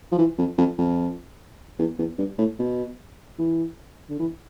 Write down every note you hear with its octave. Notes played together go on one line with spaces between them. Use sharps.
F3
E3
F2
F2
F2
E2
E2
G2
A2
B2
E3
D3
E3